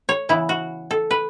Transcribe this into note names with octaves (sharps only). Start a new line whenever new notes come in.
C#5
C#3 E3 B3 E4
F#4
A4
B4